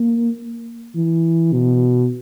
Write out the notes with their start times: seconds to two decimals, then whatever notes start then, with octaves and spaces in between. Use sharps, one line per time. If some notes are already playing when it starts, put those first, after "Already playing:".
Already playing: A#3
0.95 E3
1.53 B2